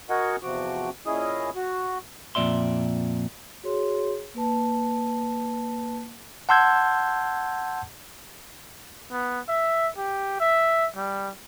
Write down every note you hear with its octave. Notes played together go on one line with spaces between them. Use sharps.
F#4 A#4 D#5 F#5 G#5
E2 C3 F3 F#4 D6
A#2 C#4 E4 G#4 D#5 D#6
F#4
F2 A#2 D5 E5 C6
F#4 G#4 C#5 C6
A#3 B4 A5
F#5 A5 C6 E6 G6 G#6
B3
E5
G4
E5
G3